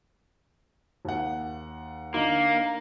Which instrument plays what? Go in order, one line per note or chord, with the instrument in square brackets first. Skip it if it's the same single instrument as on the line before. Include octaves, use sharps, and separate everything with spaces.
[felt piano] D#2 F#5
[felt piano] D3 D#4 [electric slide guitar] A#3